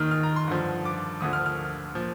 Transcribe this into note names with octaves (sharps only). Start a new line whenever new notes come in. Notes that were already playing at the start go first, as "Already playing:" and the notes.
Already playing: D#2 D#3 D#6 F6
F6
A#5
C6
G2 D3 F3
D6
D2 D3 F3 D#6
F6
F6
A#2 F3